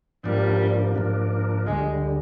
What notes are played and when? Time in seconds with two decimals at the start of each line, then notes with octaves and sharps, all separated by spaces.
0.24 G#2 F3 G3 A#3 D4
0.95 G#2 F3 A#3 D4
1.66 D2 D3 G3 G#3